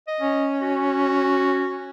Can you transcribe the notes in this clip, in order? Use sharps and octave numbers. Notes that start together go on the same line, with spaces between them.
D#5
C#4
F#4